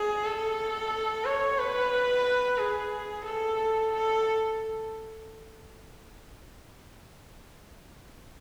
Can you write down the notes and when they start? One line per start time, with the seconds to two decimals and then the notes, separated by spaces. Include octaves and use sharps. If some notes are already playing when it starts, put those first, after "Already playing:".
Already playing: G#4
0.25 A4
1.25 C#5
1.59 B4
2.58 G#4
3.25 A4
3.92 A4